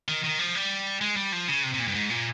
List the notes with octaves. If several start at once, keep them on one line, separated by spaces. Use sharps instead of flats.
D#3
D#3
F3
G3
G#3
G3
F3
C#3
C3
C3
A#2
G2
G#2
A#2